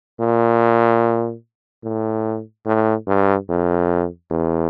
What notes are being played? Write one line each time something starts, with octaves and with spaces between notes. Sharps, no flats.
A#2
A2
A2
G2
F2
E2